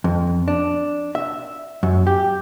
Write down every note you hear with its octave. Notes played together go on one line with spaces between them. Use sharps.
F2
D4
E5
F#2
G4